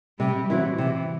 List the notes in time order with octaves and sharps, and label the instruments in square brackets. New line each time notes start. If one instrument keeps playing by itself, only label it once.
[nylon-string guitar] C3 [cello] G3
[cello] E3 [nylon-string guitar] F#3 C4 E4
[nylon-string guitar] C3 [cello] E3